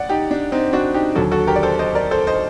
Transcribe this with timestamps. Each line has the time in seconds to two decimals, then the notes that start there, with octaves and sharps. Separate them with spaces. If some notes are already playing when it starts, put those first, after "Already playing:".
Already playing: A1 D5 F#5
0.09 D#4 G4
0.31 D4
0.52 C4 D#4
0.73 D4 F#4
0.94 D#4 G4
1.15 D#2 D3 F#3 F#4 A4
1.32 F#4 A4
1.47 G4 A#4
1.56 D5
1.63 A4 C5
1.79 C5 D#5
1.95 A#4 D5
2.11 A4 C5
2.27 C5 D#5